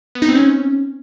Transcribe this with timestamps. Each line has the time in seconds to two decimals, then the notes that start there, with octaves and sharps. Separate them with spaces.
0.15 B3
0.22 D#4
0.29 C4
0.35 C#4